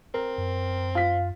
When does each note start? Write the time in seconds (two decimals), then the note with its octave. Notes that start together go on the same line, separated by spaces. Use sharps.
0.14 C4 A#4
0.38 F#2
0.95 F4 F5 B6